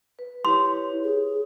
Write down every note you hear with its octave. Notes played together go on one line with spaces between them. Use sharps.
B4
E4 G4 B4 C#5 C6
G#4